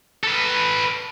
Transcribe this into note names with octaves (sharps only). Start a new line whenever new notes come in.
A4 B4